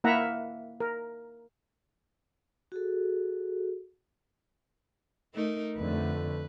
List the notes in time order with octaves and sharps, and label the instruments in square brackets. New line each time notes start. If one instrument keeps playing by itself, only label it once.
[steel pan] A#3 E4 E5 F#5 A#5
A#4
[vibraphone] F#4 G#4 A4
[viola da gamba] A3 D#4 A#4
[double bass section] F2 D3 A3 [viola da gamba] B4